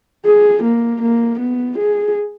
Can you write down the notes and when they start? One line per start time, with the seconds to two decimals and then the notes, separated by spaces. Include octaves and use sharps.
0.25 G#4
0.64 A#3
1.02 A#3
1.40 B3
1.78 G#4